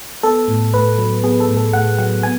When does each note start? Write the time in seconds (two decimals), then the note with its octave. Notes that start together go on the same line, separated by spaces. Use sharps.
0.23 B3 A4
0.48 A2
0.74 A2 B4
0.98 F#3
1.24 B3 G#4
1.40 A4
1.49 A2
1.57 A4
1.73 A2 F#5
1.98 F#3 F#5
2.23 B3 G#5